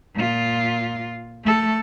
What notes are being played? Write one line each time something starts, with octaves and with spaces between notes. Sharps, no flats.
A#2 F4
A3 A4